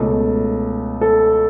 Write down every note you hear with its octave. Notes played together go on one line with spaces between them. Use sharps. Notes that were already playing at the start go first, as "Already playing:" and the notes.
Already playing: C#2 B2 A3 A4
A4